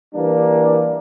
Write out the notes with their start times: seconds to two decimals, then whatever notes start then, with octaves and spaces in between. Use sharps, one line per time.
0.13 E3 G3 A#3 D4